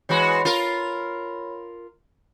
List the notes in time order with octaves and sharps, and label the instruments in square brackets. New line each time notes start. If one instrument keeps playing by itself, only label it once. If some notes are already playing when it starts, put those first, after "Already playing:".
[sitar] E3 G#3 F#4 [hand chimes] C#5 B5
[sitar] F4 A#4